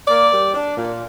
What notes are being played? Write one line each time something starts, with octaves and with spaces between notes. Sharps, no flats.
A#3 D5
G3
D4
A#2